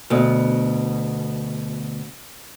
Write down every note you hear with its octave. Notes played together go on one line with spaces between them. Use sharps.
D2 B2